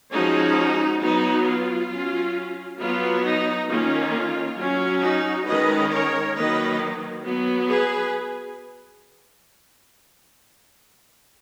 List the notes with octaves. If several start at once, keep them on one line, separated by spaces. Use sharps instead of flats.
F3 G#3 C#4 D#4 F#4
F#3 B3 D#4
F4
F#3 C#4
F#3 B3 F4
D#4
D#3 A#3 C#4 F4
F#3 C#4
D#4 F#4
D#3 G#3 C#4 B4 D#5
A#4 C#5
D#3 F#3 A#3 B4 D#5
F#3 B3
G#4 B4